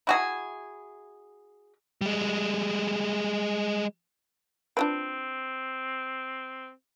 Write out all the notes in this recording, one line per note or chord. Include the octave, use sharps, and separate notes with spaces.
E4 F#4 G#4
G3 G#3
C4 D4 F4 B4